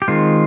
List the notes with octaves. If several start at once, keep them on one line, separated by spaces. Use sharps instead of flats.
G4
D#3 G#3 C4 F4